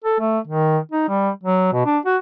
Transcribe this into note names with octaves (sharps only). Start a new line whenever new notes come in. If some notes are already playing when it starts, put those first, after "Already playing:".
A4
A3
D#3
D#4
G3
F#3
B2
D4
F#4